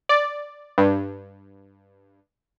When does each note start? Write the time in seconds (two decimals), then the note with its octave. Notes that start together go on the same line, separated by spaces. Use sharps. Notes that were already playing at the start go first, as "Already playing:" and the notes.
0.09 D5
0.78 G2